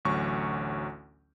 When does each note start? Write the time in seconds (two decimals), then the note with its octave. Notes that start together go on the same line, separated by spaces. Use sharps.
0.05 A1 D2 F#3 C#6